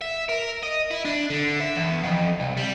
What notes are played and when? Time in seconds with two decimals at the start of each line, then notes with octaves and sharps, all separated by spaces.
0.01 E5
0.29 A#4
0.63 D#5
0.91 E4
1.05 D4
1.30 D3
1.60 E5
1.75 E2
2.03 F2
2.40 C2
2.57 G3